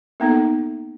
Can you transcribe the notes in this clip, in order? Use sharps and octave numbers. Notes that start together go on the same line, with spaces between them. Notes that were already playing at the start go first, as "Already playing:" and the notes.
A#3 B3 D#4 A4